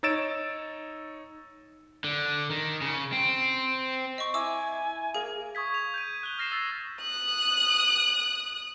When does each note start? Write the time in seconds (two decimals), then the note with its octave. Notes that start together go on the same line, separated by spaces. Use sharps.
0.03 D#4 C#5 E6 A6 D7 E7
2.04 D3
2.50 D#3
2.82 C#3
3.13 C4
4.18 D#5 C#6
4.34 E4 G#5 D6 E6
5.15 A#3 G#4
5.55 C#6 D#6 G#6 B6
5.74 F7
5.94 G6 G#6 D#7
6.23 F#6 G7
6.38 F6 A#6 C7 E7
6.52 E6 A6 C7
7.02 D#6 F#6